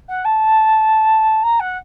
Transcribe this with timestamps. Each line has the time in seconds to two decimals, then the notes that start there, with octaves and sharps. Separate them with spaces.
0.08 F#5
0.24 A5
1.43 A#5
1.60 F#5